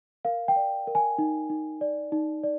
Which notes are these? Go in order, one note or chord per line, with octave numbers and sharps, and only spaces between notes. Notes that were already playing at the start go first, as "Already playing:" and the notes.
A#4 F5
G5
D5
A#4
G#5
D#4
D#4
D5
D#4
D5